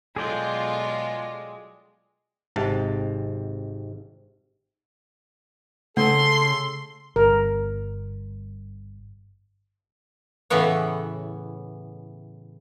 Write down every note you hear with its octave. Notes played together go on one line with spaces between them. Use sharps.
B2 F#3 G#3 F4 G#4 A4 D5 G5
G#1 G#2 C3 A5
C#3 A3 A4 C6
G1 A#4
A2 C#3 E3 B3 C#5